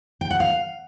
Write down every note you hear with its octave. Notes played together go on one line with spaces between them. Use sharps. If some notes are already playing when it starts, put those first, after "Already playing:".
G5
F#5
F5